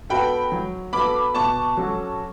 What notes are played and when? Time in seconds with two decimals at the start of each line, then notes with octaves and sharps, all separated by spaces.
0.10 B3 F#4 A4 G5 B5
0.52 F#3
0.93 B3 F#4 A4 B5 D6
1.35 B2 A5 C#6
1.77 F#3 C#4 F#4 A4